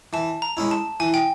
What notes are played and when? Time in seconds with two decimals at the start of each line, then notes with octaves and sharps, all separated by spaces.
0.13 E3 A5
0.42 A#5
0.57 G#3 C#4 E4
0.71 A5
1.00 E3 G#5
1.14 G5